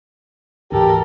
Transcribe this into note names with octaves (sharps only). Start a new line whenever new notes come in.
D2 G#2 E3 G4 A4 A#4